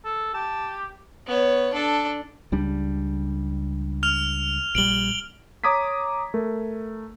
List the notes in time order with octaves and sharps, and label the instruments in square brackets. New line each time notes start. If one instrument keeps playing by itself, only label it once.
[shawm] A4
[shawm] G4 [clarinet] A5
[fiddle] B3 C#5
D4 A4
[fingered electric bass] C#2 G3 D4
[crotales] F6 F7
[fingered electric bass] A#1 G3 [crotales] D7 F#7 G7
[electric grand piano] C#5 A#5 D6 D#6 G#6 B6
A3 A#4